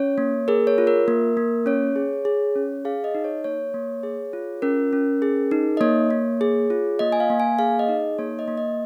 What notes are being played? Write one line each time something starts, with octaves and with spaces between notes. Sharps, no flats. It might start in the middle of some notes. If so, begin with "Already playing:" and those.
Already playing: C#4 C#5
A#3
G#4 A#4
C#5
F4
A#4
A#3
A#3
C#4 C#5
G#4
G#4
C#4
G#4 F5
D#5
D#4
C#5
A#3 C#5
A#3
G#4
F4
C#4 A#4
C#4
G#4
D#4
D#5
A#3 C#5
A#3
G#4
F4
A#3 D#5
G#5
F5
A#3
G#5
G#4 F5
D#5
D#4
A#3 C#5
D#5
A#3
D#5